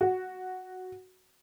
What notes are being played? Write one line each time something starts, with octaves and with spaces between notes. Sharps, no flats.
F#4